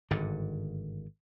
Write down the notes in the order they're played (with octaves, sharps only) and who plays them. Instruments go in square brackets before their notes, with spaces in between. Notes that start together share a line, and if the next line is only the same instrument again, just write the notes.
[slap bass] G#1 G2 D3